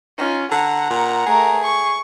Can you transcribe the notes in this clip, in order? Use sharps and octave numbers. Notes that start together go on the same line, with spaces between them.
C#4 D#4 F4
D3 F#5 A#5
A#2
A3 G#4 A#4
C#6